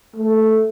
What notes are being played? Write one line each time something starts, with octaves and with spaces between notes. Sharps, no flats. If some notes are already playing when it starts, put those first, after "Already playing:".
A3